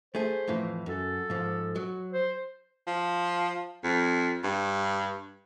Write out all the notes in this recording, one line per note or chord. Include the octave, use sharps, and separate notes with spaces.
A3 G#4 C5
F2 A2 E3
F#2 A4
G#2 F3
F#3
C5
F3
F2
G2